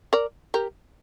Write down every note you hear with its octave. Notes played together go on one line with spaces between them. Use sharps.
A#4 D5
G4 A#4